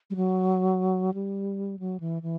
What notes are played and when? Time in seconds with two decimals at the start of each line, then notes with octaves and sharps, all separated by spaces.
0.10 G3
0.16 F#3
1.14 G3
1.79 F#3
2.00 E3
2.22 E3